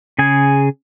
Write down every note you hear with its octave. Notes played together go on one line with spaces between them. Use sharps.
C#3 G#4 G#5